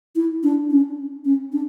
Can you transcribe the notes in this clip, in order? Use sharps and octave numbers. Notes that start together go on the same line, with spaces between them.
E4
D4
C#4
C#4
D4